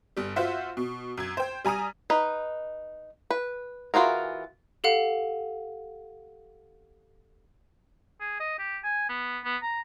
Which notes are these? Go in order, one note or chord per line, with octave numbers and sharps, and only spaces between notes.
G1 G3
F4 F#4 C5 E5 F#5
B2
F#2 G#6
C5 G5
G3 G#5 A#5 D#6 D#7
D#4 B4
B4
E3 F4 F#4 G#4 A#4
G4 A4 F5 F#5
G#4
D#5
G4
G#5
B3
B3
A#5